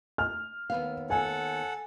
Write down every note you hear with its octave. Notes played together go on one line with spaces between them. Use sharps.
F6
D#2 B3 F5
A4 F#5 G#5